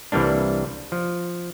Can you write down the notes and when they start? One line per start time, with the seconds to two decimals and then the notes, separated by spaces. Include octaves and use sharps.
0.12 C2 E3 G3 A#3 D4
0.92 F3